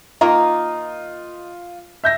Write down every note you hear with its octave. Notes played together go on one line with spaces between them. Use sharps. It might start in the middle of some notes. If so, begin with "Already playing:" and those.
D#3 A#3 D#4 F4
E5 G6 A#6